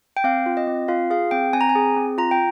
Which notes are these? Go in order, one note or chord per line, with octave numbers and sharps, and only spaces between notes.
G5
C4 F5
F4
D#5
C4
F4 F5
G#4 F5
C4 G5
C4 G#5
A#5
G#5
G#4
C4
F4 A#5
G5